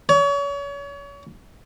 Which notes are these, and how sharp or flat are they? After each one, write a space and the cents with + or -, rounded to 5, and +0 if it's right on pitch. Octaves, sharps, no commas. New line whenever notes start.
C#5 +35